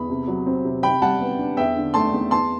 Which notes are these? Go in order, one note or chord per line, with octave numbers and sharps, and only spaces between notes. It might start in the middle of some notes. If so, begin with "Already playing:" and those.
Already playing: E2 B5
C3
F#3
C4
C3
C3 G5 B5
G3 F#5 A5
B3
D4
E2 E5 G5
D3
A3 A5 C6
E2
E2 A5 C6